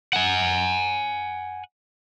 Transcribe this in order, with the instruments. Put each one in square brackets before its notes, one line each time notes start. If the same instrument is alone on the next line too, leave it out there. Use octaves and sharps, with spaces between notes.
[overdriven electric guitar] F#5 G#5